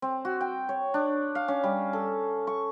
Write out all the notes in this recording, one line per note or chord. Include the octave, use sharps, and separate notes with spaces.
C4
F#4
G5
C#5
D4
F5
C#4
G3
A4
C#6